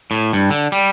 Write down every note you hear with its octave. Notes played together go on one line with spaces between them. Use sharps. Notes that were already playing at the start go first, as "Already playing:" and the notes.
A2
G2
D3
G3